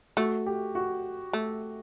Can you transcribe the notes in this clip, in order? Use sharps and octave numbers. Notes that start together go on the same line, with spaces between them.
A3 F#4
G4
F#4
A3